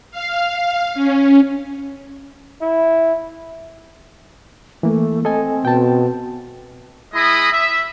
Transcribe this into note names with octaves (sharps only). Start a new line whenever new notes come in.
F5
C#4
E4
E3 A3 A#3
C4 A4 D#5 G#5
B2 G5 A5
G#3 E4 D#5 B5 D#6
E5